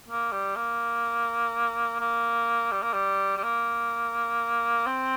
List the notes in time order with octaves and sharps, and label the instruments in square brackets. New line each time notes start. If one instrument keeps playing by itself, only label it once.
[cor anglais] A#3
G3
A#3
A#3
G3
A#3
G3
G3
A#3
C4